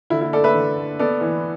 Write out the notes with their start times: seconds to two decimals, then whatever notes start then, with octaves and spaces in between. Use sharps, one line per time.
0.10 D3 E4
0.21 E4
0.33 A3 A4 D5
0.44 B4 E5
0.55 D3
0.77 A3
0.99 B3 A4 D5
1.21 E3